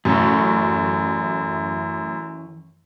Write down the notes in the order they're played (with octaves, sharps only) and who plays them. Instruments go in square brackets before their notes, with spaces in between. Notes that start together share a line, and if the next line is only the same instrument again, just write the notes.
[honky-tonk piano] F#2 A2 [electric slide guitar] E3 C#4